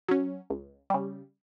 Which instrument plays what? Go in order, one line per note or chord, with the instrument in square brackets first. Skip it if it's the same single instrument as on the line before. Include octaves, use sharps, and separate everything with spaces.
[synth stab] F#3 C#4
C#2
C#3 G3